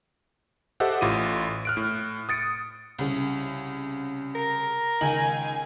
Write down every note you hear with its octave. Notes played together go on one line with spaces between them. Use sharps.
G4 A4 C5 D#5 E5 F#5
A1 A2 F4 D6 D#7
F6 F#6 D7
A2
D#6 A6 C#7 D7
C2 C#3
A#4
C#2 D#3 G#5 F#7